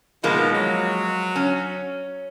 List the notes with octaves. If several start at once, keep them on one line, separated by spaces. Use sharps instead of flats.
B2 D#3 F3 G#3 A#3
F#3
C#4